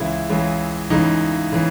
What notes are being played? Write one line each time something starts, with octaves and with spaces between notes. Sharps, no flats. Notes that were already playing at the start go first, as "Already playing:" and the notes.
Already playing: C#2 C#3 E3 E4
C#2 C#3 E3
C#2 C#3 E3 D#4
C#3 E3